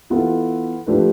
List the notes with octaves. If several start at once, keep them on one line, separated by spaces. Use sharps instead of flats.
E3 B3 F4 A4
F3 A3 D4 G4 B4